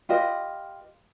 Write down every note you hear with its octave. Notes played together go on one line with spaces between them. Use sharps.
F4 G4 B4 D#5